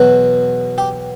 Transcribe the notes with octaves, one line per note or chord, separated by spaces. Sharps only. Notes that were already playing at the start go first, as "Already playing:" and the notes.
Already playing: E2 B2 F#3
G4